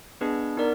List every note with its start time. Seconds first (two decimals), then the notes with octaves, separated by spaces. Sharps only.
0.21 B3 D4 G#4 B4 D#5
0.57 B3 D#4 A#4 D5